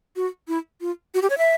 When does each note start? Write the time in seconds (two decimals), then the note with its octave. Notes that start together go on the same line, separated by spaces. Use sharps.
0.16 F#4
0.48 E4
0.81 F4
1.14 F#4
1.22 G4
1.30 C#5
1.38 E5